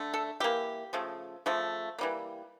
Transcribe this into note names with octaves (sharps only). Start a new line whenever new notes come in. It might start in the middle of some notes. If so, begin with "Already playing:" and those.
Already playing: D3 A3
A4
E3 A#3 G4
C#3 F3 A3
C#3 F3 A3
E3 G3 A#3